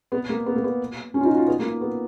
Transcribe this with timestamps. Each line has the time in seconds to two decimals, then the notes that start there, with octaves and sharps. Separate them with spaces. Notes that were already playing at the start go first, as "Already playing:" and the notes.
0.12 B3
0.29 A#3
0.46 B3
0.55 A#3
0.64 B3
1.14 C#4
1.21 F4
1.25 D#4
1.32 F#4
1.37 F4
1.47 B3
1.59 A#3
1.81 B3